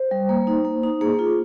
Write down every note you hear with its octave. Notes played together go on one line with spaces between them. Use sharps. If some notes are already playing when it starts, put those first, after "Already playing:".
Already playing: C5
G3
A#3
D#4
A#3
D#4
A#3 G#4
F4